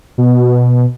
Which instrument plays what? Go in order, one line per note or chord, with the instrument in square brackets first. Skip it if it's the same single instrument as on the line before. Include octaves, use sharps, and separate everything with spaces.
[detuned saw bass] B2